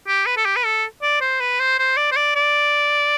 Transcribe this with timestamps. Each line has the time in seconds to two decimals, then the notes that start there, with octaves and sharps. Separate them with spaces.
0.07 G4
0.26 B4
0.37 A4
0.45 G4
0.56 B4
0.65 A4
1.02 D5
1.21 C5
1.40 B4
1.60 C5
1.79 C5
1.97 D5
2.11 C5
2.16 D5
2.36 D5